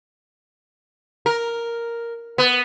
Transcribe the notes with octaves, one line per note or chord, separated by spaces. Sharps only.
A#4
B3